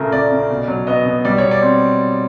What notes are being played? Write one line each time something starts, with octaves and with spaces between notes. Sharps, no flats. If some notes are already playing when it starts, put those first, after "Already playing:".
Already playing: A#2 C#3 A3 A#4
C#3 D5
C#3
B2
F#3
B3 D#5
B2
G3 D5
B2 C#5
D5
C4